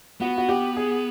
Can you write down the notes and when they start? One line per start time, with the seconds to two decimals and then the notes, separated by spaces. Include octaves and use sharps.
0.21 B3 F#4
0.37 F#4
0.49 G4
0.76 G#4